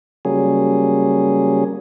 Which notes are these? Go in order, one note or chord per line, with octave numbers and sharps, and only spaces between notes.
C#3 F#3 G3 A#3 C#4 G#4